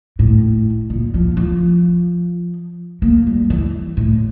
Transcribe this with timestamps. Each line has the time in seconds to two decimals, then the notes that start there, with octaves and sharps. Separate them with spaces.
0.19 A2
0.90 A#2
1.14 F3
1.37 F3
3.02 A#3
3.27 G3
3.50 E3
3.97 A2